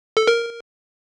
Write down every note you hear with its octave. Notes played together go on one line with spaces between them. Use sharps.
A4
A#4